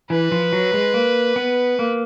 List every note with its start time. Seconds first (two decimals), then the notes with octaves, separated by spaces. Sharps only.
0.10 E3 B4
0.32 F3
0.53 F#3
0.74 G#3
0.94 A#3
1.36 B3
1.79 A#3